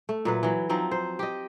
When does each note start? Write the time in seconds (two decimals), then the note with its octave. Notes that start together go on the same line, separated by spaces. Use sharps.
0.09 A3
0.25 A#2 F#3 B4
0.43 E3 F#3
0.69 F3 F#3 C4 D#4
0.91 C5
1.19 G4 D#5